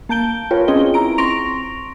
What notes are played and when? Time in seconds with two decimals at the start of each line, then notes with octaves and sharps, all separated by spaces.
0.09 A#3 A5 G6 D7 G7
0.51 F4 A#4 B4 C#5 G5
0.68 C4 C#4 F4 G#4 D#5 G7
0.94 E4 A#5 D7
1.18 C4 C6 C#6 A#6 D7 F7